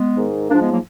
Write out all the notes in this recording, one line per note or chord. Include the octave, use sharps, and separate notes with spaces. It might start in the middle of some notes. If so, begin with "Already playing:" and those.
Already playing: G#3 B3
G#2 D#3
G#2 F3 A#3 D4
G#3 B3
F#3 A#3